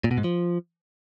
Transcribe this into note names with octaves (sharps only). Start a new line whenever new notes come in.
A#2
B2
G#2
F3